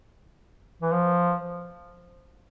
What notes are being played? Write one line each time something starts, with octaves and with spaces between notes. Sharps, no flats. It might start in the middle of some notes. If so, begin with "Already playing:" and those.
E3
F3